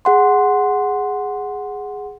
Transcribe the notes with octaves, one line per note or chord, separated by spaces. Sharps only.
G#4 F#5 C6